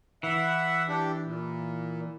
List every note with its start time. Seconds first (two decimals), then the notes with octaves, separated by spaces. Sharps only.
0.23 E3 E5 F#5
0.88 D4 G4
1.25 A#2